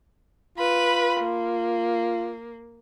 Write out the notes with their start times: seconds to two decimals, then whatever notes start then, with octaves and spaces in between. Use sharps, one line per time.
0.58 F4 B4 B5
1.22 A#3